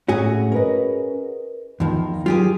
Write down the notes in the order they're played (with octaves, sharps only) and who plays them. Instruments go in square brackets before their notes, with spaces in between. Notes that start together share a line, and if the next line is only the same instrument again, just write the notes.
[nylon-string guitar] A2 [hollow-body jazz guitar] C#4 F#4 G#4
[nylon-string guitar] A#4 B4 D#5
[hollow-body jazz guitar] E2 F3 [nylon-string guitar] D#3
[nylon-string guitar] F#3 [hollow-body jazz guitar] F4 G4 G#4